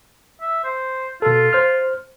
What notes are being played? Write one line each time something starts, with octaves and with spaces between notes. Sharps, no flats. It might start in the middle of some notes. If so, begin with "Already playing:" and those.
E5
C5
B2 F4 A4
C5 F6